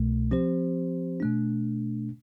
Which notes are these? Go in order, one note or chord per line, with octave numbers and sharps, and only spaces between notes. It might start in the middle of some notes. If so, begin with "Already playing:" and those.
Already playing: C2 B2 A3
F3 C4 G4 C5
B2 A3 D4